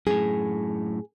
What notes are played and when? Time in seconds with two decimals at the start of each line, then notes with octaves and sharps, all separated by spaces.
0.07 F#2 A2 G#4